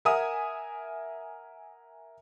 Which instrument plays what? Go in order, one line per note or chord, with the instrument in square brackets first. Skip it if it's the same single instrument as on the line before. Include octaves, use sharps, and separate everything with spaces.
[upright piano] A#4 E5 F#5 G#5 D#6